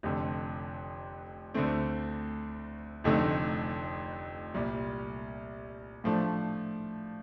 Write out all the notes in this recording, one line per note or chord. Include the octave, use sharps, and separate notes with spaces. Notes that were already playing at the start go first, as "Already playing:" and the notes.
F1 F2 D3
D2 D3 A3 C4
F1 F2 D3 A3 D#4
C2 A#2 G3
A2 F3 A3 D4